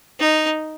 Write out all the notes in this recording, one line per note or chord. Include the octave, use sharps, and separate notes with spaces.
D#4